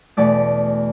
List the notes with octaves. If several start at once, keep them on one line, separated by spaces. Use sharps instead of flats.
E2 B2 A3 D5